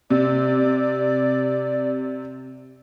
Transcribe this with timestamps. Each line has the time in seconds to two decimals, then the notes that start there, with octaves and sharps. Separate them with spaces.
0.10 C3 D5